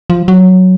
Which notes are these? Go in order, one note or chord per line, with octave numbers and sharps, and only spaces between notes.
F3
F#3